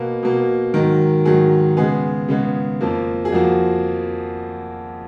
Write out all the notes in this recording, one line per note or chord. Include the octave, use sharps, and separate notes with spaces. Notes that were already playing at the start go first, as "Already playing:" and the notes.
Already playing: B2 A#3 B4
B2 A#3
G#2 D#3 F#3 A#4
G#2 D#3 F#3 G#4
C#3 G#3 B3 G#4
C#3 G#3 B3
F2 F3 A#3
G#4
F2 F3 A#3 F#4